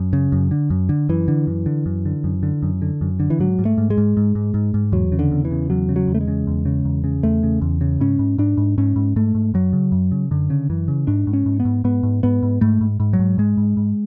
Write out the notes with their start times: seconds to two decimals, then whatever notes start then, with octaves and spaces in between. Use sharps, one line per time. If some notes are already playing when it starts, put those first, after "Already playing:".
Already playing: F#2
0.13 C#3
0.32 F#2
0.51 D3
0.70 F#2
0.89 D3
1.09 F#2 E3
1.28 D3
1.47 F#2
1.66 D3
1.86 F#2
2.06 D3
2.24 F#2
2.43 D3
2.63 F#2
2.82 D3
3.01 F#2
3.20 D3
3.30 E3
3.40 G#2 F#3
3.59 G#2
3.65 A3
3.78 G#2
3.90 G#3
3.98 G#2
4.17 G#2
4.35 G#2
4.54 G#2
4.74 G#2
4.92 E2 F#3
5.12 C#3
5.19 D3
5.32 E2
5.45 E3
5.51 C#3
5.70 E2 F#3
5.89 C#3
5.96 F#3
6.08 E2
6.15 A3
6.21 G#3
6.28 C#3
6.47 E2
6.65 C#3
6.85 E2
7.04 C#3
7.23 E2 A3
7.43 C#3
7.62 E2
7.81 C#3
8.00 G#2 C#4
8.19 G#2
8.38 G#2 D4
8.57 G#2
8.78 G#2 C#4
8.96 G#2
9.16 G#2 A3
9.35 G#2
9.54 F#2 F#3
9.73 C#3
9.92 F#2
10.12 C#3
10.31 F#2 D3
10.50 C#3
10.70 F#2 E3
10.88 C#3
11.07 G#2 D4
11.27 G#2
11.33 C#4
11.46 G#2
11.60 B3
11.65 G#2
11.84 G#2 B3
12.03 G#2
12.23 G#2 B3
12.43 G#2
12.61 G#2 A3
12.81 G#2
13.00 G#2
13.13 F#3
13.19 G#2
13.38 G#2 G#3
13.57 G#2
13.77 G#2